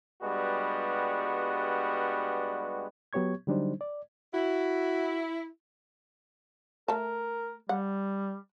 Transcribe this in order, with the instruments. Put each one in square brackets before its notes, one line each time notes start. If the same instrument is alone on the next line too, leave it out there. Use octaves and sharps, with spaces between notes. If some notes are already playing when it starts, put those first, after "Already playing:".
[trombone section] G2 G3 G#3 B3 F#4
[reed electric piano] F#3 B3 G4 C#5 C#6 G#6
D3 F#3 G3 D4 D#4 C5
D5
[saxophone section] E4 [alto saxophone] F#4
[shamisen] A3 A5 [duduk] A#4
[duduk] G3 [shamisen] F#5